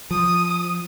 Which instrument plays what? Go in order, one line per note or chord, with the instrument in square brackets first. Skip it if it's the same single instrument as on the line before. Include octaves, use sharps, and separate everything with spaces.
[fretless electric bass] F3 [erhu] D#6